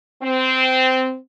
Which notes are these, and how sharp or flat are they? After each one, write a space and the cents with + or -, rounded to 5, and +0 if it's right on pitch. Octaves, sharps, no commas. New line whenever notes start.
C4 -15